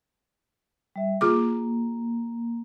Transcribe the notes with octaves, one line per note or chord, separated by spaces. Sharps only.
G3 E5
A#3 F4 G#4 D6